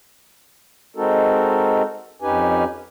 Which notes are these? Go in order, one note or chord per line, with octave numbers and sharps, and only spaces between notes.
G#3 C4 D#4 F#4 A4 A#4
F2 C#4 D#4 G4 B4 G#5